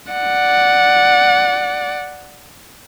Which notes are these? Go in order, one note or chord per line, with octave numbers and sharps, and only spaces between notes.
D5 F#5